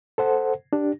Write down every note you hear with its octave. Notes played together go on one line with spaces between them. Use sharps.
A4 C5 F#5
D4 G4